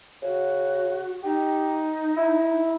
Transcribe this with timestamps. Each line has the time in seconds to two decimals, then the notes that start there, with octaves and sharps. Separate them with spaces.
0.22 C#3 F#4
1.23 D#4 G4
2.17 E4